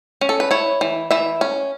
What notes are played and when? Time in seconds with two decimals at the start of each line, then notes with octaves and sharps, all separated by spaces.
0.21 C#4
0.29 A4
0.40 B4
0.51 E4 C#5
0.81 E3
1.11 E3 E5
1.41 C#4